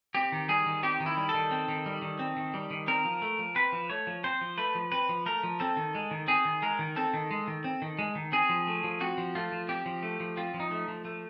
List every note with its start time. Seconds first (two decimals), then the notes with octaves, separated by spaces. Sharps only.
0.15 C4 G4
0.32 D#3
0.49 G3 G#4
0.66 D#3
0.83 C4 G4
1.00 D#3
1.06 E4
1.17 G3
1.29 A4
1.34 D#3
1.51 C4
1.68 D#3
1.86 G3
2.02 D#3
2.19 C4
2.37 D#3
2.54 G3
2.71 D#3
2.88 C4 A#4
3.05 F3
3.22 A3
3.39 F3
3.55 C4 B4
3.73 F3
3.90 A3 C#5
4.07 F3
4.24 C4 C5
4.41 F3
4.58 A3 B4
4.75 F3
4.92 C4 B4
5.09 F3
5.26 A3 A#4
5.43 F3
5.60 C4 A4
5.77 D#3
5.95 G#3
6.11 D#3
6.28 C4 G#4
6.45 D#3
6.62 G#3 A#4
6.79 D#3
6.96 C4 A4
7.14 D#3
7.31 G#3
7.48 D#3
7.64 C4
7.82 D#3
7.99 G#3
8.15 D#3
8.32 C4 G#4
8.49 F3
8.67 A3
8.84 F3
9.00 C4 F#4
9.18 F3
9.35 A3 F4
9.52 F3
9.69 C4 G4
9.86 F3
10.03 A3
10.20 F3
10.37 C4 F4
10.54 F3
10.60 D#4
10.71 A3
10.88 F3
11.05 A3